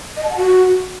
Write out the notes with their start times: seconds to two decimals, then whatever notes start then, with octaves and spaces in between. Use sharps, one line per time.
0.16 D#5
0.23 A5
0.30 F#5
0.37 F#4